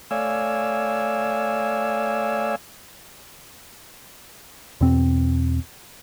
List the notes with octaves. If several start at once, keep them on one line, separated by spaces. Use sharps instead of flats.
A3 C#5 D5 F5 G#5 E6
E2 B2 C4